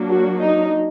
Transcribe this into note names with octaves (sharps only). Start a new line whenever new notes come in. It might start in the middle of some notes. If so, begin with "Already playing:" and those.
Already playing: F#3 A#3 D4
F#4
D#4